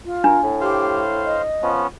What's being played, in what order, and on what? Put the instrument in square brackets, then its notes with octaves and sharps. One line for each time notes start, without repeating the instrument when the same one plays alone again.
[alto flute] F4
[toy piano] D4 [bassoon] A#4
[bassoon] A2
[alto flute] G4 [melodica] C5 F5
[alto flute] D#5
[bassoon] F3 [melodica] B3 C#4